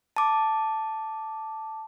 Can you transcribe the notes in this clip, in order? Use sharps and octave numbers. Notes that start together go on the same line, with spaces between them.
A5 D6